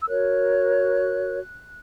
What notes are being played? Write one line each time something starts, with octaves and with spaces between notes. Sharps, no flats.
E6
F#4 A#4 C#5 F#6